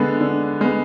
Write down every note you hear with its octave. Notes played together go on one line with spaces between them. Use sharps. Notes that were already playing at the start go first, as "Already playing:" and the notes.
Already playing: D3 G#3 B3
D3
G#3 B3